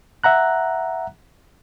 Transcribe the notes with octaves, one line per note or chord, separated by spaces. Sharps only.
E5 F#5 A#5 F#6